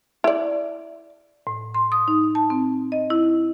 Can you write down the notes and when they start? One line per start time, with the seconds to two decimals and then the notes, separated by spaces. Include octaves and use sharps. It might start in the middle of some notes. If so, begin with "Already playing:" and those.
0.24 E4 D5
1.47 A2
1.74 C6
1.92 D#6
2.08 D#4
2.35 A5
2.50 C4
2.92 D#5
3.10 E4